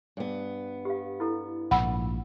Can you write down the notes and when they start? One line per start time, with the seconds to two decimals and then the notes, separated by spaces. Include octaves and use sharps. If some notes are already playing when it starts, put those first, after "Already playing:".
0.17 G2 B3
0.85 G4 F5
1.20 E4 A4
1.71 A#1 G#2 F#5 B5 E6